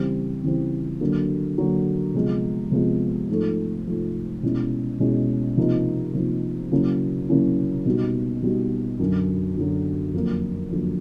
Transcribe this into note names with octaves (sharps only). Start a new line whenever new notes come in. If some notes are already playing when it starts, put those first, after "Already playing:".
Already playing: C#3 E3 G3 C4
C#3 E3 G3 C4
D3 F#3 A#3
D3 F#3 A#3
C3 F3 G#3 B3
C3 F3 G#3 B3
G#2 F3 A3
G#2 F3 A3
B2 G#3 C#4 E4
B2 G#3 C#4 E4
C3 F3 A#3 D#4
C3 F3 A#3 D#4
C#3 F#3 A#3 C#4 E4
C#3 F#3 A#3 C#4 E4
B2 G3 B3 D#4 F#4
B2 G3 B3 D#4 F#4
F#2 D3 F#3
F#2 D3 F#3
F2 D3 F#3 A#3
F2 D3 F#3 A#3